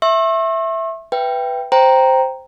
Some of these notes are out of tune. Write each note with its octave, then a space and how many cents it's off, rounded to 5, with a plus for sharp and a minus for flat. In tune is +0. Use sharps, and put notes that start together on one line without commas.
E5 +0 C#6 -45 E6 +0
B4 +0 E5 +35 G5 +0
C5 +0 G5 +0 A#5 +0